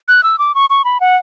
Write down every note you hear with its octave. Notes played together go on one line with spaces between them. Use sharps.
F#6
E6
D6
C#6
C#6
B5
F#5